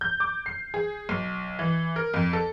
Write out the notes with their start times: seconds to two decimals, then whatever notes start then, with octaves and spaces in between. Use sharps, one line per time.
0.01 G6
0.20 D6
0.46 C7
0.74 G#4
1.09 B1
1.59 E3
1.96 A#4
2.14 F2
2.33 A4